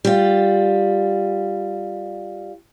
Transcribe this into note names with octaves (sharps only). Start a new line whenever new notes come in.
G3 F4